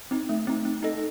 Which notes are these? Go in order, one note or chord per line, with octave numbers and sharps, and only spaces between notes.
C4 D#4
A3
C4 D#4
C4
D#4 A4 D#5